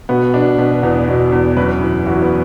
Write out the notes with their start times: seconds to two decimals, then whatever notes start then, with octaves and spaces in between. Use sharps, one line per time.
0.09 B2 B3
0.34 B2 D4
0.58 B2 B3
0.83 E2 B3
1.08 B2
1.32 E2
1.57 F#2 B4
1.81 E3
2.06 E3 F#4
2.22 B3